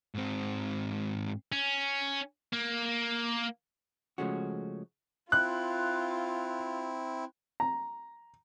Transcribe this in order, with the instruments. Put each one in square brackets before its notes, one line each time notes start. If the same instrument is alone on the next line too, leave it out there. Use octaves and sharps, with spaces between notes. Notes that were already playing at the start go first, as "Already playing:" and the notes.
[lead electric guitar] G#2 C4
[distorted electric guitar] C#4
A#3
[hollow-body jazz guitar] C#3 F3 G#3 A3 C#4 F#4
[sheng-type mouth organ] C4 E4 [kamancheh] F4 [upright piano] F#6
[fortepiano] A#5